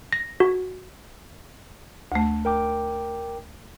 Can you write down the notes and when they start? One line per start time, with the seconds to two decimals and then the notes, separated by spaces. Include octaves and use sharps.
0.13 A#6
0.40 F#4
2.12 D2 A3
2.45 A#4 G5 D6